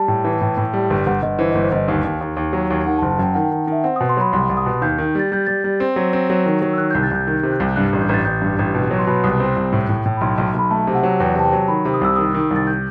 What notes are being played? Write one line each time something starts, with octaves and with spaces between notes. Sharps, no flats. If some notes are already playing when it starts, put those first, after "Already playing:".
Already playing: G3 A5
A2
E3
A2
A2
G3
G1
G1 F#5
G1 D#5
E3 C5
D#5
G1
C5
G1 D#5
D#2
D#2
D#2
D#2
F#3
D#2
D#3 F#5
A5
F#1
A5
F#2 G5
D#3 F#5
G5
D#3
D#3 E5
C4 F#5
D#6
B2
C6
F#3 B5
C2 C6
C2
D#6
B2
D#2 G6
D#3
G3 A6
G3 G6
G3 A6
G3
C4
F#3
C4
F#3
D#3
F#3
E6
D#3 F#6
G6
C2
A6
C2 G6
D#3 G6
C3
F#6
C2
G2 F#6
F#6
A1
G6
A1 A6
A1 G6
G2
A1
B2
F#3
C6
B2 B5
C6
C2 D#6
C4
C2
A2
A2
A2
B5
B1 C6
B1
B1 B5
A3 A5
C3
F#5
F#3
E2 G5
C3 A5
G5
F#3
D#3 B5
C3
D#6
C2 E6
D#3 D#6
D#3
C2
A6
G6